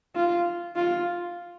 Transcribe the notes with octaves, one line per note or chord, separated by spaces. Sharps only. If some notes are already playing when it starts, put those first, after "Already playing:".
F4
F4